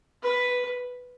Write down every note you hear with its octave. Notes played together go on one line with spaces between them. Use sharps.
B4